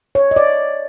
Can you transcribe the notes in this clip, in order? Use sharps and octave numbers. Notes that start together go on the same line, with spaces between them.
C#5
D#5
D5